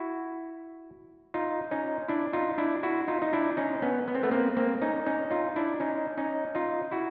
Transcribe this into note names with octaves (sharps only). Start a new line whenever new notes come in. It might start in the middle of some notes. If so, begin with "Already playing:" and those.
Already playing: E4 F#4
D#4 F4
C#4 D#4
D4 E4
D#4 F4
D4 E4
E4 F#4
D#4 F4
D#4
D4 E4
C#4 D#4
B3 C#4
B3
C4
A3 B3
A#3 C4
A#3 C4
C#4 D#4
C#4 D#4
D#4 F4
D4 E4
C#4 D#4
C#4 D#4
D#4 F4
E4 F#4